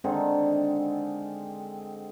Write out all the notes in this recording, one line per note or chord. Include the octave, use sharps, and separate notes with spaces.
D3 D#3 G#3 C4